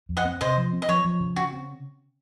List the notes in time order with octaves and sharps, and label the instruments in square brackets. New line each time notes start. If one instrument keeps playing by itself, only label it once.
[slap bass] F2
[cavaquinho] D#5 F#5
[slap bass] C4
[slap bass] C3 [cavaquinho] C5 D#5
[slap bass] F3
C4
[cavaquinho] D#5
[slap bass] F3 [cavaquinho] C#5
[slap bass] F3
C#3
[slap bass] C#3 [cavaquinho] F#4
[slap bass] C4